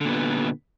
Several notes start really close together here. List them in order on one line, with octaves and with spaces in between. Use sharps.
D3 A#2 B3